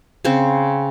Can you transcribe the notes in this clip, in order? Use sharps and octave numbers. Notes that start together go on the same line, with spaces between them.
C#3 C4